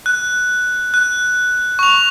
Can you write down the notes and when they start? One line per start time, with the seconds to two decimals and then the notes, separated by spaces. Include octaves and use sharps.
0.06 F#6
0.94 F#6
1.79 C#6 F7